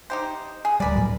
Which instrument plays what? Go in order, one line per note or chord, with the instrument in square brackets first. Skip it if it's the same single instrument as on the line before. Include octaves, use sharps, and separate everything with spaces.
[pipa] D#4 G4 C5
G#4
[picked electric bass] D1 G3 [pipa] A#4 B4 D5
[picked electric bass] A2 F#3